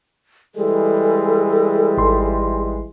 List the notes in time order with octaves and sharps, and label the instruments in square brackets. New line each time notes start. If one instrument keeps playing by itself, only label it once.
[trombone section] E3 G3 G#3 [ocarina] A4
[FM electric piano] G#1 C6